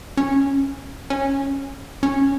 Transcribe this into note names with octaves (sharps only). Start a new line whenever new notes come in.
C#4
C#4
C#4